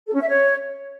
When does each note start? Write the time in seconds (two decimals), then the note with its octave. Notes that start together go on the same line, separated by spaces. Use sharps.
0.08 A4
0.15 C#4
0.21 E5
0.28 C#5